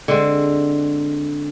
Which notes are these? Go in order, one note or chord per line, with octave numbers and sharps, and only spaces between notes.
D3 G#3 C4